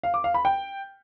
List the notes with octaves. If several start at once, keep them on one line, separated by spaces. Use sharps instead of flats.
F5
D6
F5
B5
G5